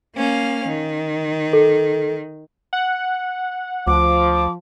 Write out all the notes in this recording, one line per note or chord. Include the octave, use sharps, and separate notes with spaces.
A#3 C#4 F5
D#3
A4
F#5
D2 F3 D6